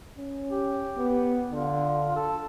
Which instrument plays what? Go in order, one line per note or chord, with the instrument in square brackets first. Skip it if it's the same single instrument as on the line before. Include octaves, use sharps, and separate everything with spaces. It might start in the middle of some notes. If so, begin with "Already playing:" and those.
[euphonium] C#4
[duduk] G4
[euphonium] B3
[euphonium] D3 [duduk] F4
[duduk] A4